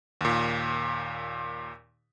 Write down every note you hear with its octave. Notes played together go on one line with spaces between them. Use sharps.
D#2 A#2